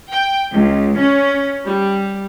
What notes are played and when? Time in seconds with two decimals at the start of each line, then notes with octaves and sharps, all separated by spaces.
0.11 G5
0.52 C#2
0.98 C#4
1.63 G3